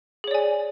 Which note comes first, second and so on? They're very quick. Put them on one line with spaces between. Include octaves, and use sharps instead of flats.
G#4 C#5 D5 G#5